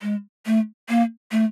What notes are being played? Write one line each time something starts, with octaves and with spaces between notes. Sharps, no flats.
G#3
A3
A#3
A3